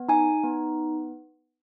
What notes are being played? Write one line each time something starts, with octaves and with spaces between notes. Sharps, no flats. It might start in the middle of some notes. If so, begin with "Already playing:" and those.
Already playing: B3
D#4 G#5
B3